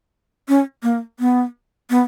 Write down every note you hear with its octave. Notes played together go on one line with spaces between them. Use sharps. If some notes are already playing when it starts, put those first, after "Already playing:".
C#4
A#3
B3
B3